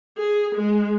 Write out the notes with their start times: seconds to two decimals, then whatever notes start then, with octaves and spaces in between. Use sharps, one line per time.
0.18 G#4
0.55 G#3